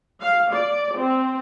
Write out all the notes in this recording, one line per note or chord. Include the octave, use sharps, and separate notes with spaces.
F5
D5
C4